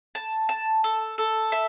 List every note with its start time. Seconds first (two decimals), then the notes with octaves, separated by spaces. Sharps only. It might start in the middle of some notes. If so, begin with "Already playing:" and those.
0.15 A5
0.49 A5
0.84 A4
1.18 A4
1.52 E5